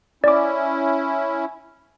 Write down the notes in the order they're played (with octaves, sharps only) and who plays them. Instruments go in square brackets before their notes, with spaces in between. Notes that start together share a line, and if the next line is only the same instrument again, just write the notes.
[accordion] C#4 E4 [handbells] D5 D6